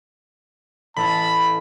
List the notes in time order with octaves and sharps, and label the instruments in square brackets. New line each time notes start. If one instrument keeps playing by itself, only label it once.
[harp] A1 E4 A#6 [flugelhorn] A5 [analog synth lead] B5